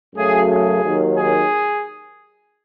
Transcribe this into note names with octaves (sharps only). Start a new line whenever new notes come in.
F#2 C#3 F#3 A3 G#4
G#4
D#2 D#3 F#3
G#4